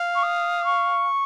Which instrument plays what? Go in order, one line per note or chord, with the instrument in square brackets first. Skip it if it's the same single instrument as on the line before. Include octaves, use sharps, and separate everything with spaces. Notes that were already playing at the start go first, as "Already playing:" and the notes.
Already playing: [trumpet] F5
[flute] C#6
D#6
C#6